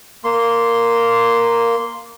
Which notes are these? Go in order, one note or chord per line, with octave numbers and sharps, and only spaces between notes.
A#3 C6